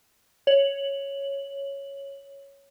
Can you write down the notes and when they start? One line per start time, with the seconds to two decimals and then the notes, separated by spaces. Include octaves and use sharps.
0.47 C#5 F#7